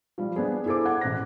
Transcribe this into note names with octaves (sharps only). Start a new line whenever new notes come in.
F3 G3
B3 D4 G#4 C5
E4 G#4 A4 C5 D6
F#5 G#6
A1 F#6 A#6